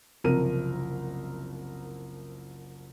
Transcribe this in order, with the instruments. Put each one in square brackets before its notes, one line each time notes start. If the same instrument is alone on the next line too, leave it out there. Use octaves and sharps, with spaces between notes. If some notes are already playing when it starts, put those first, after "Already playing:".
[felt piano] F#1 C2 F3 A#4 D#7